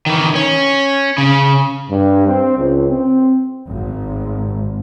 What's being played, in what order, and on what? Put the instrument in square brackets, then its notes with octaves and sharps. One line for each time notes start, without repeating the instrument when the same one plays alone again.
[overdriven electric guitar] D#3 E3
C#4
C#3
[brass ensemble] G2
C4
C#2
C4
[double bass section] G#1